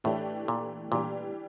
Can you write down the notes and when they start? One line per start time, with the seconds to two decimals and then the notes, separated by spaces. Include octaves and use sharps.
0.04 A2 E3 A3 D4 G4
0.48 A#2
0.92 A#2 E3 G3 D4 G4